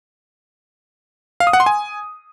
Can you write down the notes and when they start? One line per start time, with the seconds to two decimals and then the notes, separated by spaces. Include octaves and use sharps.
1.40 F5
1.47 D#6
1.53 F#5
1.60 C6
1.66 G#5